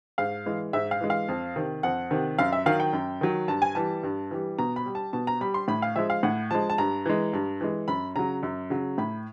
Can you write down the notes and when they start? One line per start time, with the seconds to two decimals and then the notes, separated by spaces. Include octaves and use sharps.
0.18 G#2 F5
0.46 E3 G#3
0.73 G#2 E5
0.91 F5
1.01 E3 G#3
1.10 F5
1.28 F2
1.56 C3 D#3
1.83 F2 F#5
2.11 C3 D#3
2.38 F#2 F5
2.52 E5
2.66 D#3 F#3 F5
2.80 G5
2.93 F#2
3.21 D#3 F#3
3.48 G2 A5
3.62 G#5
3.75 E3 G3 A5
4.03 G2
4.31 E3 G3
4.58 B2 A#5
4.76 B5
4.86 G3
4.95 A5
5.13 B2 A5
5.27 A#5
5.41 G3 B5
5.54 C6
5.68 A2 B5
5.82 F5
5.96 F3 G#3 E5
6.10 F5
6.23 A2 F#5
6.51 F3 G#3 A5
6.70 A5
6.78 G2 A#5
7.06 E3 G#3
7.33 G2
7.61 E3 G#3
7.88 F#2 B5
8.16 C#3 F#3 A#5
8.43 F#2
8.70 C#3 F#3
8.98 A2 B5